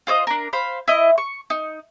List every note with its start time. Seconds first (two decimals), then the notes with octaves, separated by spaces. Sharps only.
0.07 F4 C5 C#5 D#5
0.27 D4 A#4
0.53 C5 F5 B5
0.88 E4 D#5
1.18 C#6
1.50 D#4